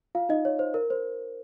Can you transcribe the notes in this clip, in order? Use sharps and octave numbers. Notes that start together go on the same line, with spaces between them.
F4 F5
D#4 D#5
C#5
C5
A#4
C5